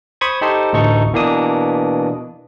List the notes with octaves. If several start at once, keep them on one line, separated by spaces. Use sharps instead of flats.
C5 B5 C#6 D#6 G#6
D#4 G4 A4 C5
A1 D2 D#4 A4 C#6
B2 E3 A#3 D4 D#6